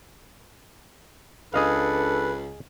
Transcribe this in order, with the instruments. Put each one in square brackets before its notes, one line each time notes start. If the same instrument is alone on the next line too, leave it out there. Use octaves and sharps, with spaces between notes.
[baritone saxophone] C#2 [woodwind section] D4 A4 [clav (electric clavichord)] G#4 D#5 F5 [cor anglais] B4